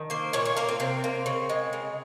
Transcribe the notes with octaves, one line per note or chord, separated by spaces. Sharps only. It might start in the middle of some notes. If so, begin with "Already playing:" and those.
Already playing: D#3
A#3 C5
A#2 C#5
C#5
A#3 A#4
C4
C3 C4
A#3
C#3
G#3
C#3